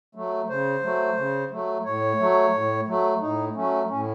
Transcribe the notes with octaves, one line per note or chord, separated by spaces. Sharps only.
F#3 A3
C#3 C5
F#3 A3
C#3
F#3 A3
A2 C#5
F#3 A3
A2
F#3 A3
A2 D#4
F#3 A3 C#4
A2 C#4